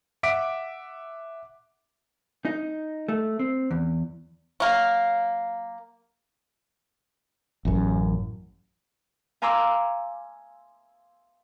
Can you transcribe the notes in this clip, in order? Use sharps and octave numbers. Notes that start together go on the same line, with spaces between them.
E5 F#5 D6 B6 D7
D#4
A3
C4
E2
F#3 A#3
A1 F#2
F5 G#5 A#5 C6 D6 E6